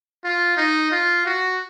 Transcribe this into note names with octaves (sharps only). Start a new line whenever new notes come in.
F4
D#4
F4
F#4